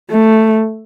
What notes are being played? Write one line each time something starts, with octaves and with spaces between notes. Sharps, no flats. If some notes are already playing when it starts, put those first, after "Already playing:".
A3